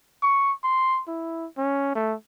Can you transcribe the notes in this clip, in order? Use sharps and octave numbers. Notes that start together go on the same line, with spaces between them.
C#6
C6
E4
C#4
A3